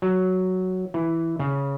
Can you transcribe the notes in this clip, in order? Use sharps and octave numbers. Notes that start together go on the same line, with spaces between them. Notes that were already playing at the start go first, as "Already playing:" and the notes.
F#3
E3
C#3